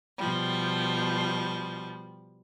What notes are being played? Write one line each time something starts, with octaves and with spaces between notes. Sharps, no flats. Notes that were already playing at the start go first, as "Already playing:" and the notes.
B2 F3 G3